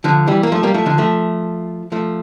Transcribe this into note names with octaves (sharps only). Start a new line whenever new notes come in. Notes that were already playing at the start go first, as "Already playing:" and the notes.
D3 F3
E3 G3
A#3
F3 A3
G3 A#3
F3 A3
D3 F3
F3 A3
F3 A3